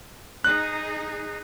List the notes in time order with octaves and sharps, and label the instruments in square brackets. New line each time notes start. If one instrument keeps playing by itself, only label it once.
[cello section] D#4 G#4 [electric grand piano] F#6